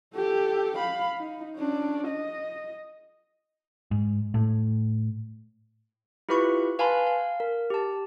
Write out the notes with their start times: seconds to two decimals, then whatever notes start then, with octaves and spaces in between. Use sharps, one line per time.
0.15 G4 A4
0.78 F5 B5
1.18 D#4
1.57 C#4 D4
2.08 D#5
3.91 G#2
4.34 A2
6.29 E4 F4 G4 B4 B5 C#6
6.79 B4 F5 G#5 A5 B5 C6
7.07 F5
7.40 A#4
7.70 G4 A5